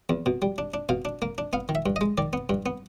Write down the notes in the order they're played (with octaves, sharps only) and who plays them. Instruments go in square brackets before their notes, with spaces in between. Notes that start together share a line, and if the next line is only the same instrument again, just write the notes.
[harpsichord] E2
B2
G3
D4
D4
B2 F5
D4
A#3
D4
B3 F5
D#3
E5
G2
D#5
G#3
D#3 D5
B3
G2
B3